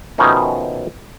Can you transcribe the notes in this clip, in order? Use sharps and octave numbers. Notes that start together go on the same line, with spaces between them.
B2 D#3 F3 A3 C#4 D#4